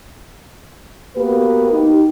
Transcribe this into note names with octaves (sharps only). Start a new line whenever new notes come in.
A#3 B3 F#4 G4 B4
D#4 G4